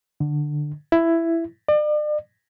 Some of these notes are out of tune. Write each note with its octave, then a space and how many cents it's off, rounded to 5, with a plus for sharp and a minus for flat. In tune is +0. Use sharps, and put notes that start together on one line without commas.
D3 +15
E4 +10
D5 +40